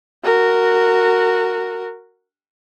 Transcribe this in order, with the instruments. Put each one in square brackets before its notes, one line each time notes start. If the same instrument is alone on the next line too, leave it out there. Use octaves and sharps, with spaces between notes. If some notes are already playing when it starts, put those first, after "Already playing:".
[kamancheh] F#4 A#4